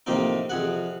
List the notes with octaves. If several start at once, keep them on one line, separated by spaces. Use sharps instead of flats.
A2 C3 F3 A#3 C4 D#4
F2 C3 G#4 F#5